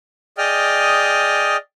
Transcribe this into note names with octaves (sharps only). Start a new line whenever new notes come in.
G#4 D5 D#5 G5 D#6 F6